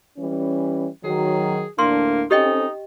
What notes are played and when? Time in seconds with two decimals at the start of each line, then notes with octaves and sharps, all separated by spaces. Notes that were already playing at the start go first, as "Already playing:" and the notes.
0.18 E3 G3 C#4
1.04 D#3 F#3 G#4
1.79 D2 A2 A#3 D4 C6
2.31 C4 C#4 D#4 G4 A4 D#5 G5